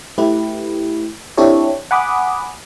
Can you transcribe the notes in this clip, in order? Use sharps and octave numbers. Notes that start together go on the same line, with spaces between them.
A3 E4 G4 B4
C4 D4 E4 G4 A4 C#5
F#5 G#5 B5 D6 D#6